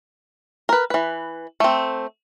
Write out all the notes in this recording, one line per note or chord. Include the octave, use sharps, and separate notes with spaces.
A#4 B4
E3 B4
A3 C4